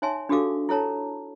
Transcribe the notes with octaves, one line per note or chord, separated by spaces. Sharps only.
D#4 C#5 E5 G#5 A5 C6
D4 F#4 G4 A4 F5 D6
E4 A4 C#5 A5 A#5